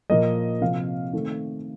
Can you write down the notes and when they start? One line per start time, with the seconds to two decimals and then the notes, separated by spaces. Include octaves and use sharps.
0.10 A#2 F3 A#3 D#5
0.62 C3 F3 C4 F5
1.13 D#3 A3 C4